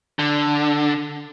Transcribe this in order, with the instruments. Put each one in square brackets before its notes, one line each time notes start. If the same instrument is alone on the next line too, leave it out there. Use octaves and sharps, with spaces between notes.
[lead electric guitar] D3